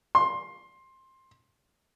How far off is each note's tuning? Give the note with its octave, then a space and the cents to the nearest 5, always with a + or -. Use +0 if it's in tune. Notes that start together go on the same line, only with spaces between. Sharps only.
C6 +15